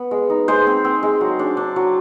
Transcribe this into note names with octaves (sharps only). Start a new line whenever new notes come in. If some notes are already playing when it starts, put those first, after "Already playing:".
Already playing: B3
G#3
D#4
G#3 C5
C4
C4
G#3
F#3
D4
D4
F#3